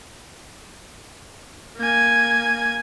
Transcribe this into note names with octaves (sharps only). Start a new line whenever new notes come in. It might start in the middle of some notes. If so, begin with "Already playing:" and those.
A#3 G#5